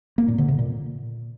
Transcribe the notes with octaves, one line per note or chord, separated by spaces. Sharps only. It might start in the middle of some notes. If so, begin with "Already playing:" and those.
A#3
A#2
D3
C3
A#2